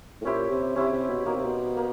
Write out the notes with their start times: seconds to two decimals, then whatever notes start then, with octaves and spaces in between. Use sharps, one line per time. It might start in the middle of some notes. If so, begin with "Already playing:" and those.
0.21 A2
0.25 A#2 C#4 E4 G4 C5
0.50 C3
0.76 C3 C#4 E4 G4 C5
0.92 C3
1.10 B2
1.26 B2 A#3 D#4 G4
1.35 C3
1.46 B2
1.77 A#3